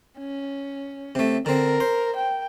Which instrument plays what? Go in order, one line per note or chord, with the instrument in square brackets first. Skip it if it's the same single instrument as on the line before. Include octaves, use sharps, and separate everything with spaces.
[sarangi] C#4
[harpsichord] C3 A3
[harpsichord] D3 C4 [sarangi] A#4
[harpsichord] C5
[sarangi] G5